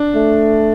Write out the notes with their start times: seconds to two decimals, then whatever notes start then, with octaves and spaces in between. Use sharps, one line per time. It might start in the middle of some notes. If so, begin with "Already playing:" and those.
Already playing: D4
0.15 A3